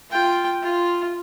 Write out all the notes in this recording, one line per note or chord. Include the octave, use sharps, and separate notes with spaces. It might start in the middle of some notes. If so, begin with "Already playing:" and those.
F4 G5
F4